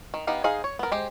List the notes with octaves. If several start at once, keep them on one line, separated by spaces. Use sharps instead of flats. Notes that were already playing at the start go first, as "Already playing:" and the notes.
D#3
B3 D#4 G4 F5
D#4 G#4 C5 F5
C#5
B3 A#4
G#3 G4 C5